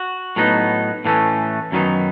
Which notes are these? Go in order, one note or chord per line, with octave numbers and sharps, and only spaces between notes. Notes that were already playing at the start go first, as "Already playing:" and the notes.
Already playing: F#4
A2 F#3 B3 D#4
A2 E3 A3 C#4
F#2 D#3 F#3 B3 D#4